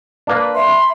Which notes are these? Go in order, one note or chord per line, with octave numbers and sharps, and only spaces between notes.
A#3 D4 B4
E5 B5 C6